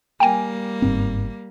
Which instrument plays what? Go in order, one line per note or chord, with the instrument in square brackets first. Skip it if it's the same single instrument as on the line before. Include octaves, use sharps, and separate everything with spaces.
[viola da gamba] G3 A#3 [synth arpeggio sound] G5 G#5
[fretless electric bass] G1 G#2 C4